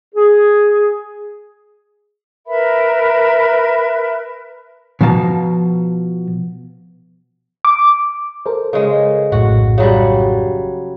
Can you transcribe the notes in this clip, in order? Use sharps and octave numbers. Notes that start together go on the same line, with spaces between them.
G#4
A#4 B4 E5 B5
B2 F3 F5 A5 A#5
D6
A4 A#4 C5
C#3 G#3
A#1 F#2 A2 F#4
C#3 F#3 G3